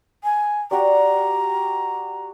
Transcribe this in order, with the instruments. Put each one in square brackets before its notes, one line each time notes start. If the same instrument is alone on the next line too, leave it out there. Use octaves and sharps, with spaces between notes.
[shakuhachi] G#5
[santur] F#4 G4 D5 [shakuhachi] A#5